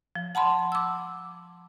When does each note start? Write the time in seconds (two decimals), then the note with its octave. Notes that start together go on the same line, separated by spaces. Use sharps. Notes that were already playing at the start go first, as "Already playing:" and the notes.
0.15 F3
0.35 F#5 A5 B5 C6
0.72 D6 E6